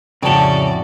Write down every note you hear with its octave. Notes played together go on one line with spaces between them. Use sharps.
F2 A2 C#3 C#4 F#4 D5 G5 A5